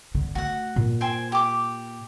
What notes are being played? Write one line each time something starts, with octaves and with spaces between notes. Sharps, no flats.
D3
A3 F#4 F#5
A#2
C5 G5 G#5
G4 D6